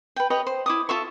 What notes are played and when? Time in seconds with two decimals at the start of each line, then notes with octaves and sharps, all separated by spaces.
0.16 B4 G5
0.30 G4 B4 C#5 D#5
0.47 C5
0.66 E4 D6 D#6
0.89 F4 A4 E5 C#6